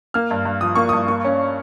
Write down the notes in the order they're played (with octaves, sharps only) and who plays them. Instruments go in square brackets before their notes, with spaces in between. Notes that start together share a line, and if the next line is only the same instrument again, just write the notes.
[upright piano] A#3 F6
G2
G2
F3 D#6
A#3 C#6
G2 D#6
A#3 C#6
C#4